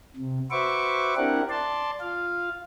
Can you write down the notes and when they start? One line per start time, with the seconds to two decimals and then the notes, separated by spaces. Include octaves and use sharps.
0.16 C3
0.51 F#4 B4 C5 E5 C#6 D6
1.17 C4 D4 E4 G4 A#4 F#5
1.49 D5 A5 C6
2.01 F4 F5